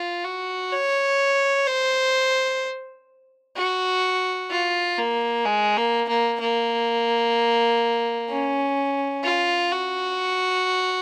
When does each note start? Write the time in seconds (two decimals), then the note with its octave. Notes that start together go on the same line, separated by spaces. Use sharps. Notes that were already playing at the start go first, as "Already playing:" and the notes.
Already playing: F4
0.24 F#4
0.72 C#5
1.67 C5
3.57 F#4
4.51 F4
4.98 A#3
5.45 G#3
5.78 A#3
6.09 A#3
6.41 A#3
8.30 C#4
9.24 F4
9.72 F#4